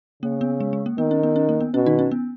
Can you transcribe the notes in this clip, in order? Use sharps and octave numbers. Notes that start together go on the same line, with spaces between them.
C#3 A#3
B3
G#3
G#3
A#3
D#3 B3
C#4
B3
C#4
A#3
B3
B2 C#4
D#3 D#4
C#4
B3